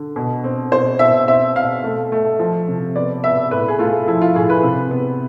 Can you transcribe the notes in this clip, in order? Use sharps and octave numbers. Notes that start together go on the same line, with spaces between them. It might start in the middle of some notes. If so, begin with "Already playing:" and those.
Already playing: D3
B2
C4
B2 C5
B2 E5
C4 E5
B2 F5
A3
A3
F3
C3
B3 D5
B3 E5
A2 B4
G#4
A3 F4
F3 E4
F4
A2 G#4
B4
C3
B3